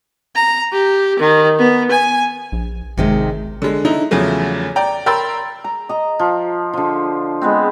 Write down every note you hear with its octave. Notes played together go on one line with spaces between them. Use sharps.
A#5
G4
D#3
B3
G#5
A#1
G#1 C3 D#3 G#3
D3 G#3
D3 D#4 E4
E2 C#3 F3 F#3 A3
D5 G5 A#5
A#4 G5 B5 C6 E6 A6
A#5
D#5 A#5
F3
D3 F3
G#3 B3 C4